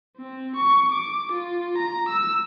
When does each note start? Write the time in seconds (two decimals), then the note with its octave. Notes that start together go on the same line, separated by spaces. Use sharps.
0.17 C4
0.57 C#6
0.93 D6
1.33 F4
1.78 A#5
2.09 E6